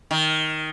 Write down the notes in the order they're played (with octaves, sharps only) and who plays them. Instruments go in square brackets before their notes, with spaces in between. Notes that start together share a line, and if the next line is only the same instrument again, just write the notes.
[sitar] D#3